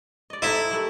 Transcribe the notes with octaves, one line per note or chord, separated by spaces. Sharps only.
D5 D#5
D#4 E4 A4 C5
A#5
G3 A3 A#3